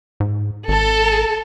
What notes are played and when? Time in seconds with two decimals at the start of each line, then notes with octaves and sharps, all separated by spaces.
0.20 G#2
0.68 G#1 A4